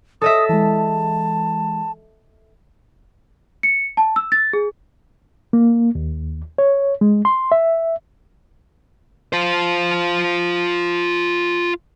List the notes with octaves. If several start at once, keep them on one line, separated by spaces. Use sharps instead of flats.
A4 D#5 E5 D#6
E3 G#3 A5
C#7
A5
E6
A6
G#4
A#3
D#2
C#5
G#3
C6
E5
F4 C5